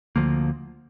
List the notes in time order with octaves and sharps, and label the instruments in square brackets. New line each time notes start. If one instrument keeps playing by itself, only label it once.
[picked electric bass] D2 D3 F3 A#3